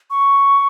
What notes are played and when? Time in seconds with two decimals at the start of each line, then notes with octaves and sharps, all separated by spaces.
0.11 C#6